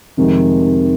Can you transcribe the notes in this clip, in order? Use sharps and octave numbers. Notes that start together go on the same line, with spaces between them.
F1 F2 C3 D#3 G#3